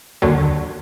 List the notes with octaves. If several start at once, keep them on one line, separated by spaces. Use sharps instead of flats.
D#2 D3 F#3